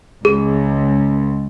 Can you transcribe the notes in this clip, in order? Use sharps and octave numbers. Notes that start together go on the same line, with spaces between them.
C#2 G#4